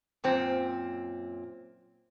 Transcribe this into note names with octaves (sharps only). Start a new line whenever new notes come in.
F#2 A#2 C4